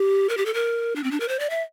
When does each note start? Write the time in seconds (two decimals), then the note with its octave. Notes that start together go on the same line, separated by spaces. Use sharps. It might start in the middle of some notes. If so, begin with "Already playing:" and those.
Already playing: G4
0.29 A#4
0.37 G4
0.46 A4
0.54 A#4
0.96 D4
1.04 C4
1.11 D4
1.20 A#4
1.28 C5
1.39 D5
1.50 E5